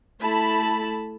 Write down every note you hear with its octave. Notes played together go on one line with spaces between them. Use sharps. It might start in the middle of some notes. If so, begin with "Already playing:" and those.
A3 E4 A5 B5